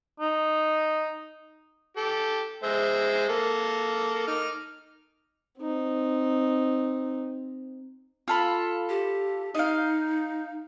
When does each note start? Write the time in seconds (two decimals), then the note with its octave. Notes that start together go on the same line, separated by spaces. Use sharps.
0.20 D#4
1.97 G4 A4
2.63 G#3 C5 E5
3.29 A#3 A4
4.28 D#4 D6 F6
5.59 C4 D#4
8.28 F4 A4 B5
8.89 G4
9.55 D#4 D#5 F5